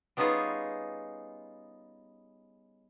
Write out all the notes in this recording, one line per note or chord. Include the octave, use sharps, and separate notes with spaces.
G3 B3 C#4 D#4 F4 G#4